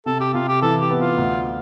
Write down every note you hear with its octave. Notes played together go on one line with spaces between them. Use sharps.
C3 A4
G4
C3 F4
G4
E3 A4
G4
B3
F4
D2